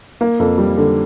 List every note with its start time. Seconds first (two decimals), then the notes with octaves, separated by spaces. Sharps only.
0.21 A#3
0.39 F2
0.58 G3
0.77 D3